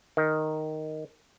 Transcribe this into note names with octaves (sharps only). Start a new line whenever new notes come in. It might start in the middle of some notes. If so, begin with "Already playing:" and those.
D#3